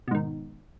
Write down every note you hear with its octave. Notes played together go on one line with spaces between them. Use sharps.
G#2 B2 D#3